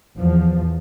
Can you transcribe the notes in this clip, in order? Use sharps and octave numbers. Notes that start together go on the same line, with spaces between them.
E2 F3